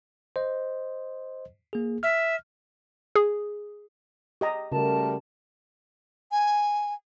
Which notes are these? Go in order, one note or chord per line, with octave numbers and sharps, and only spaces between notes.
C5 D#5
A#3 G#4
E5 F6
G#4
G4 D#5 A#5
C#3 G3 A3 F#4 A#4 A5
G#5